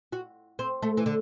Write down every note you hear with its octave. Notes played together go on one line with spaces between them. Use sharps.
F#4
C4
A3
E3
D3